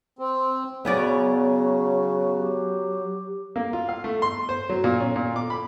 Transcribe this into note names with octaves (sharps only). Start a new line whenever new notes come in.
C4
C#3 F#3 B3 C#4 D5
G4
A#3
F4
F5
A3
C6
C5
F#3
A#2
C#4
A#2
D6
B5